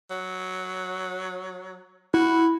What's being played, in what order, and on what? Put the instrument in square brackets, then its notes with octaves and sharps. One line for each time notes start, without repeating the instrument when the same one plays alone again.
[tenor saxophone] F#3
[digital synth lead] E4 [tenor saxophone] F#4